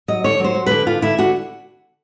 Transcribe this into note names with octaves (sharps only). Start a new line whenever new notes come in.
F#3 D#5
D3 C#5
F#3
C5
F#3
D3 B4
D3 F4
D3 E4
D3 F#4